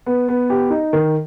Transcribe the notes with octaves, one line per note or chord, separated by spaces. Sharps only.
B3
B3
G4
D#4
D#3